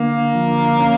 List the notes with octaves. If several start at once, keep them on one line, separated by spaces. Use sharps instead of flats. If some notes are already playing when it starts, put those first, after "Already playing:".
Already playing: D3 A#3
F3
C#4